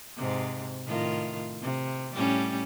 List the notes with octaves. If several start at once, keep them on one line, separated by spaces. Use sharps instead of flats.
G#2 C3
A2 D#3 F4
C3
A2 G3 C#4